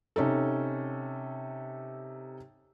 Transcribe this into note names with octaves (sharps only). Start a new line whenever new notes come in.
C3 C#4 D#4 A4